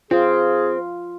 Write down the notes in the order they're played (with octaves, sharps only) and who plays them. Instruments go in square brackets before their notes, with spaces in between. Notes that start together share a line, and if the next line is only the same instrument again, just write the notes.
[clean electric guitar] C4 [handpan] F4 [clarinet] G#4